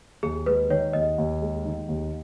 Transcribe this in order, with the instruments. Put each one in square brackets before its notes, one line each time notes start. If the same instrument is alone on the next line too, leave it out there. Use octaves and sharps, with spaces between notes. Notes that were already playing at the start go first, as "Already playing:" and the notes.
[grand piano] D#2 [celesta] G#4
[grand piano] G#3 [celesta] B4
[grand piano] D#3 [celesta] C#5
[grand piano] D#2 [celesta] D#5
[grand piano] D#2
G#3
D#3
D#2